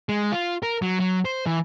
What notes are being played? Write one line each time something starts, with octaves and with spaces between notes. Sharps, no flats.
G#3
F4
A#4
F#3
F#3
C5
E3